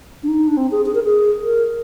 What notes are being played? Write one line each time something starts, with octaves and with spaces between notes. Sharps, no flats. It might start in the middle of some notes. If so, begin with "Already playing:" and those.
D4
D#4
D4
C4
G#4
G#4
A#4
G#4
A#4